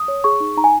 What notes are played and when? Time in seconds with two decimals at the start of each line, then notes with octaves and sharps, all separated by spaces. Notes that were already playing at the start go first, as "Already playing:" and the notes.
Already playing: D#6
0.08 C#5
0.24 G#4 C#6
0.40 D#4
0.57 D#4 A#5
0.64 G#5